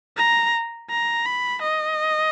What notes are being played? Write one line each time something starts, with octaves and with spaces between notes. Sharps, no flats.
A#5
A#5
B5
D#5